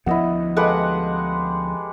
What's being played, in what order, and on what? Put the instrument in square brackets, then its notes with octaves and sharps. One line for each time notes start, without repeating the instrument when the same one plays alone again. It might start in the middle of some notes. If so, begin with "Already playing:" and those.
[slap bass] D2 F3 B3 [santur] E4 D#5 F#5
[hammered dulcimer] G#3 G4 F#5 [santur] A4 B4 F5